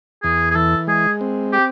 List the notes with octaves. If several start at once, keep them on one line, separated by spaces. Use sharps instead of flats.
E2 G#4
G#4
E3 A4
G#3 G#4
C4
G4